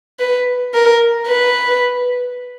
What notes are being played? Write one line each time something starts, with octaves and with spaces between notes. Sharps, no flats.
B4
A#4
B4